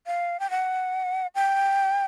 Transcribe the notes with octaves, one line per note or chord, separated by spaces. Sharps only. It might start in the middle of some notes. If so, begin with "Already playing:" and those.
F5
G5
F#5
G5